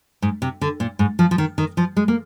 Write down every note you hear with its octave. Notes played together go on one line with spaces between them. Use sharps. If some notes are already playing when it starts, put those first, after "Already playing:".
G#2
C3
D3
A#2
G#2
F3
F3
D#3
D#3
F3
G#3
A#3